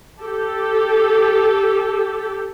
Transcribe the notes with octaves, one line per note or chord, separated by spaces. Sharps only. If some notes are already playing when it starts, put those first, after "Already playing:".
G4 A4